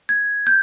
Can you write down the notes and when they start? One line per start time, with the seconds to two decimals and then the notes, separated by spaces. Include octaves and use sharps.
0.09 G#6
0.47 G6